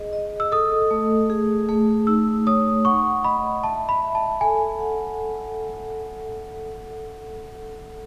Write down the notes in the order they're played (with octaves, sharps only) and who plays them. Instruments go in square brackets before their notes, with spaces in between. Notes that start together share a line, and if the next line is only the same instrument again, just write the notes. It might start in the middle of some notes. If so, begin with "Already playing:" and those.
Already playing: [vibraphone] G#4 D#5
D#5
[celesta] E6
[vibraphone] A4 [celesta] D#6
[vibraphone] A3
G#4
A3
[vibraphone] D#4 [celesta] E6
[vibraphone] C#5 [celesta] D#6
[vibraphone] F#5 [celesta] C#6
[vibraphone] D#5 [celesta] B5
[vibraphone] E5 [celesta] A5
[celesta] B5
[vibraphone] E5
[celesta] A5
[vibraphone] A4 [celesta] G#5
[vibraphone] F#5